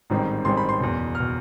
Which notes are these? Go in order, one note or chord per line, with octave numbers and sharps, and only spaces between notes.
A1 G#2 D#3 G3 C4
A1 G#2 D#3 G3 C4 C6
B5
C6
F#1 E2 B2
F6
B2